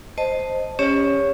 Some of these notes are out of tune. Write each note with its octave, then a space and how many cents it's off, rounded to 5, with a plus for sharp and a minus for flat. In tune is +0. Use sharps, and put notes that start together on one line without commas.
C5 +0 D#5 +0 A5 +0
C#4 +0 G4 +35 C#5 +10